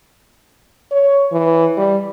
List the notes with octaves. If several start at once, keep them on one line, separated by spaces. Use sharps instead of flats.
C#5
E3
G3